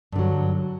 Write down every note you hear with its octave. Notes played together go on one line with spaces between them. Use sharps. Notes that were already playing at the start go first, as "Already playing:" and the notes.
G2 D3 F#3